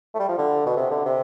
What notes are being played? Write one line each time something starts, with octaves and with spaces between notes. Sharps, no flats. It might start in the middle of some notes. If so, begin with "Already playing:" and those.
A3
G3
F3
D3
B2
C3
D3
C3